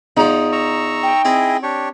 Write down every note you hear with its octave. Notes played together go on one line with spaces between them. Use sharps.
E2 F3 D#4
A#5 C#6 E6
G5
C4 E4 G#4 D#5
D4 G4 C#5